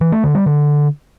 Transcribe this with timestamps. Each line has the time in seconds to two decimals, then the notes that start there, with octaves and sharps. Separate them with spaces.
0.01 E3
0.12 A3
0.23 D3
0.35 G3
0.46 D3